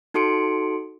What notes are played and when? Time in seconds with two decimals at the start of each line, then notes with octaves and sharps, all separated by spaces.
0.14 D#4 F#4 A4 C6 C#7 D7